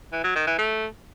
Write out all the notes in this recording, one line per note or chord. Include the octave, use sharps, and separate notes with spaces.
E3
F#3
D#3
E3
A3